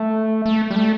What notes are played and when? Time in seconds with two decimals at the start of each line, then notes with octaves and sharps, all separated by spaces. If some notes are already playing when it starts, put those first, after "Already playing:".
Already playing: A3
0.46 A3
0.71 G3
0.76 A3